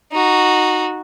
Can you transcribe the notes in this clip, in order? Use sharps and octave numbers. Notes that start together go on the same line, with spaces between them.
D#4 F#4